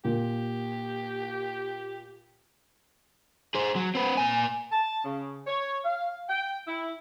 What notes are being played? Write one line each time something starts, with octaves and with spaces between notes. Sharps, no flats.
A#2 G4
G#4 C5
F#3
C4 B4
A#2 G#5
A5
C#3
C#5
F5
G5
E4